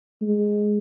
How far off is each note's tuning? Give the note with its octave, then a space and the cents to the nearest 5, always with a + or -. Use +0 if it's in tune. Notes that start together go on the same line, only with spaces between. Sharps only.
G#3 +0